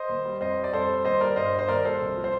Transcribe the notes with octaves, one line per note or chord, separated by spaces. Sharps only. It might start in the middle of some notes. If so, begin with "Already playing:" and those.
Already playing: C5 D#5
D#2
G3
F2 C5 D#5
G3
D5
F2 A4 C5
G3
D#2 C5 D#5
G3 A#4 D5
G2 C5 D#5
G3
C5
D#2 A#4 D5
G3 A4 C5
C2
F3
C5